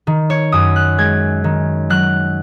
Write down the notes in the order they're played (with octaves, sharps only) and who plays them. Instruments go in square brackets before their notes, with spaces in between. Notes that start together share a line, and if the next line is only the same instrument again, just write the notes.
[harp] D#3
C#5
F#2 D#6
F#6
G#3 G#6
D#3
F#3 F#6